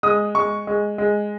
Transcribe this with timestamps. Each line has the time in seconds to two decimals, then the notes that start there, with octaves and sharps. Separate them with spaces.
0.03 G#3 D#6
0.35 G#3 C#6
0.67 G#3
0.98 G#3